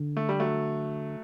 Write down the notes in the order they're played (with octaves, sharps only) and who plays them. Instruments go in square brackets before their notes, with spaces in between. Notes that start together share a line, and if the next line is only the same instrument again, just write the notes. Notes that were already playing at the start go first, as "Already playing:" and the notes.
Already playing: [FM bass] D3
[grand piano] A3
G3
F#3 A3